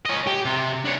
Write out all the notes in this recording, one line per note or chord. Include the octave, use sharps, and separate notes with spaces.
C#4 D#5
G4
C3
D4 C#5